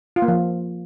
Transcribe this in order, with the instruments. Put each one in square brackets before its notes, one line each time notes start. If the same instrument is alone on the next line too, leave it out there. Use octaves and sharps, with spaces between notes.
[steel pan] F4
A#3
F3